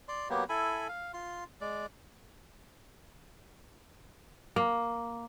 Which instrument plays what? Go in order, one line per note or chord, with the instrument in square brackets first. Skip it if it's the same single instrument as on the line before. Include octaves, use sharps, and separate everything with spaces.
[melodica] D5 C6
F#3 A#3 B3 G4
E4 A4 G#5 B5
F5
F4 C6
G#3 D5
[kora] A#3